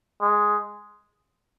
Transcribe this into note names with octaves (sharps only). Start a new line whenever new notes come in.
G#3